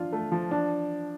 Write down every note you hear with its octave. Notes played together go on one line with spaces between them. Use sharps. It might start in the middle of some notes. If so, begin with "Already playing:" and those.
Already playing: F3 D4 F4
A3
F3
D4